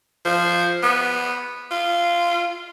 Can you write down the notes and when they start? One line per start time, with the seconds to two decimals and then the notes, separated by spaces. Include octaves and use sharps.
0.25 F3
0.83 B3
1.71 F4